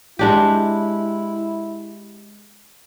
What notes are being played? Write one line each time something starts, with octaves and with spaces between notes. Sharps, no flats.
G#3 D4 E4 G4